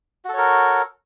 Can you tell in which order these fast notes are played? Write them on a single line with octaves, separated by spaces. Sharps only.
F#4 A4 C#5 A#4